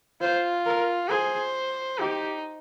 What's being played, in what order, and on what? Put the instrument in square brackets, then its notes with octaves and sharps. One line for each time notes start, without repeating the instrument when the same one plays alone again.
[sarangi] F4 [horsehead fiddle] C5
[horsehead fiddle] A#4
[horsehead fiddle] G#4 [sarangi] C5
[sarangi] D#4 [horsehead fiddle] G4